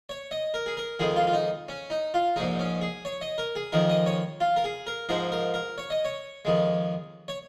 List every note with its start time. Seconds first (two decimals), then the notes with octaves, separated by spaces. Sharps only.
0.09 C#5
0.31 D#5
0.54 A#4
0.66 G#4
0.77 A#4
0.99 F2 D#3 G#3 G#4
1.16 F4
1.27 F4
1.33 D#4
1.68 C#4
1.90 D#4
2.14 F4
2.36 A#1 G#2 G#3 D#4
2.59 C#4
2.81 G#4
3.05 C#5
3.21 D#5
3.38 A#4
3.55 G#4
3.72 F2 D#3 G#3 A#4
3.90 D#5
4.06 C#5
4.40 F4
4.56 A#4
4.64 G#4
4.87 A#4
5.09 G#2 F3 G#3 A#4
5.32 A#4
5.54 A#4
5.78 C#5
5.90 D#5
6.05 C#5
6.45 F2 D#3 G#3
7.28 C#5